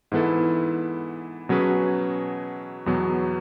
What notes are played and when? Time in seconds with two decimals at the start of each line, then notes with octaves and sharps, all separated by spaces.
0.12 G#2 E3 B3 E4 A4
1.49 B2 F#3 C#4 G#4 B4
2.86 E2 B2 F#3 B3